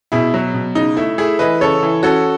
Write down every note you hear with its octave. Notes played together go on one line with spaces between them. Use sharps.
B2 E4 G#4
F#3
B2
C#3 D#4
A3 E4
A3 E4 G#4
E3 B4 D#5
C#3 A4 C#5
E3
C#4 F#4 A4